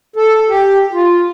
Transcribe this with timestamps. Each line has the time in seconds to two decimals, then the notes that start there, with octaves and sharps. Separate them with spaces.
0.16 A4
0.49 G4
0.92 F4